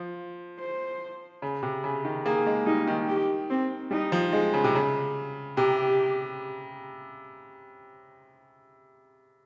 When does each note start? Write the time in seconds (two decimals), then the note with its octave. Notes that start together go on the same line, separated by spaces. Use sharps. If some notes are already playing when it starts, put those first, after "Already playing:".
Already playing: F3
0.60 C5
1.42 C#3
1.63 C3
1.84 C#3
2.05 D#3
2.25 A#3 G#4
2.47 G#3
2.66 G3 D#4
2.88 D#3
3.08 G4
3.50 C4
3.91 G3 D#4
4.12 F3
4.33 G#3
4.54 C#3
4.64 C3
4.75 C#3
5.57 C3 G4